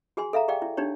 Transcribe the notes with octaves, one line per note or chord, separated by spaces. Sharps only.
F#4 G#4 G#5 C6
A4 E5 F5 A#5
G4 G#4 D5 F5 G5
E4
D4 D#4 G4 C#5